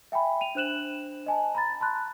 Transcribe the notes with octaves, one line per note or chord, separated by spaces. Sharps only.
E5 G5 G#5 B5
D#7 F7
D4 C5 F#6 E7 F#7
D#5 G#5 A5
A#5 B5 A6
A5 B5 C6 F#6